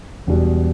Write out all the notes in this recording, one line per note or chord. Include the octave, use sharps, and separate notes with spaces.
E1 E2 B2 G3